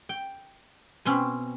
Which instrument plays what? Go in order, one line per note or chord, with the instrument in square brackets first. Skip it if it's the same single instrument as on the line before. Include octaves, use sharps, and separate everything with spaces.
[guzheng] G5
B2 C4 C#4 B5